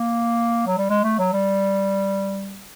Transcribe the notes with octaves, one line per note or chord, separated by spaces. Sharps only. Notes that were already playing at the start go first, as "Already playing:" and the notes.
Already playing: A#3
F#3
G3
G#3
A3
F#3
G3